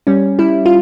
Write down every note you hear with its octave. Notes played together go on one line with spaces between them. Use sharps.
G3 C#4
G3 E4
F4